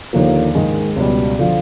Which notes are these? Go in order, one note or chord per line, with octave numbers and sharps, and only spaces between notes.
D#2 D3 F3 A#3
G#2 D#3 G#3
C#2 B2 G3
D3 F3